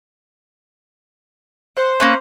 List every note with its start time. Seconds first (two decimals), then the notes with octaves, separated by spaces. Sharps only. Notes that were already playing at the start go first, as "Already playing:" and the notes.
1.77 C5 F#5
2.00 A#3 C#4 B4